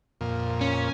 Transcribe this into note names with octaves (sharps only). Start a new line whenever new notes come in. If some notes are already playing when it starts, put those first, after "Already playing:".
F2 A#2
C#4